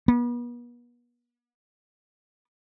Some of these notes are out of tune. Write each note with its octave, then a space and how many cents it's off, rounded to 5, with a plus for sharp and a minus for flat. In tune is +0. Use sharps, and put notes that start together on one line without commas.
B3 -40